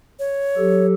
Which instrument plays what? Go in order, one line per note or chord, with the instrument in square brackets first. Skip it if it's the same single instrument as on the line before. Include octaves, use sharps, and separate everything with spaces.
[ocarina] C#5
[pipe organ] F#3 G4 A4